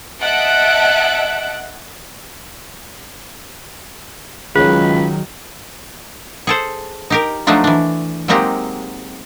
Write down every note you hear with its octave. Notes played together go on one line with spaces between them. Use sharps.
D#5 E5 F#5 A5 F#6 D7
C#2 D#3 F#3 G#4 B4 C#5
G#4 A4 C5
D#4 G4 A#4
F3 F#3 A3 D4 D#4 F4
E3 D4
F#3 G#3 A#3 C4 D#4 G4